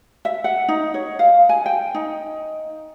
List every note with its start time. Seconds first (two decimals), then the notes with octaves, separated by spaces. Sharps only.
0.25 E5
0.44 F#5
0.68 D#4
0.94 C#5
1.19 F5
1.49 G#5
1.66 G5
1.94 D#4